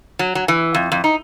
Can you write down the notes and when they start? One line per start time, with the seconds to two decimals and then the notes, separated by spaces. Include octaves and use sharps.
0.19 F#3
0.35 F#3
0.48 E3
0.75 F2
0.92 F2
1.04 D#4